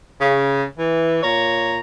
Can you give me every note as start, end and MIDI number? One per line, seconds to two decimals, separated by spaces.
0.21 0.63 49
0.77 1.22 52
1.23 1.79 46
1.23 1.79 73
1.23 1.79 82